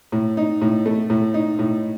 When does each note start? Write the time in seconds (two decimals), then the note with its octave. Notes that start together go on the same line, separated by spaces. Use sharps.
0.12 A2
0.37 D#4
0.62 A2
0.86 A3
1.10 A2
1.34 D#4
1.59 A2